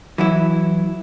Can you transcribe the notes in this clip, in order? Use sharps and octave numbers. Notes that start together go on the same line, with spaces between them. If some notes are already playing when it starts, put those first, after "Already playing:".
E3 F#3 E4